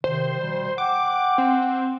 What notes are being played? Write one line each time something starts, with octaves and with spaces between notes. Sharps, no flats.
C3 D#3 C5
B2 F3 G3
F#5 G5 D6
C4